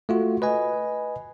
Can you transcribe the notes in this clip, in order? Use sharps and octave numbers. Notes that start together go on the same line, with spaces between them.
A3 F4 F#4
B4 D#5 G#5